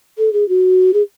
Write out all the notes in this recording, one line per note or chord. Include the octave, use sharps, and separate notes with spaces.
A4
G#4
F#4
G#4